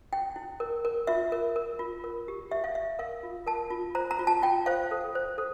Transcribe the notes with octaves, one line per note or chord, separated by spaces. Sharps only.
E4 G5
E4
A#4
A#4
F4 E5
A#4
A#4
F4
A#4
G4
G4 E5
F5
G4 E5
A#4 F5
F4
A#4 A5
F4
C5 A#5
A#5
F4
A5
F4 G5
C5 F5
A4
C5
A4